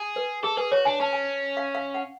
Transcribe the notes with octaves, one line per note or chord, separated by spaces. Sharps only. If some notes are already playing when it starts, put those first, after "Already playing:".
Already playing: G#4
B4
G#4 A4
G#4 B4
F#4 C#5
D4 G#5
C#4 A5
G#5
F5
F5
F#5